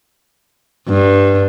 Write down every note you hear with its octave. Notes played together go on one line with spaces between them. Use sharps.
G2